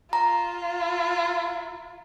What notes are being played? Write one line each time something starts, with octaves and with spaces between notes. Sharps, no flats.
F4 A#5